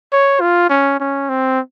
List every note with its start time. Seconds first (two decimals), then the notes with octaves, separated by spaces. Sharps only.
0.12 C#5
0.41 F4
0.70 C#4
1.00 C#4
1.29 C4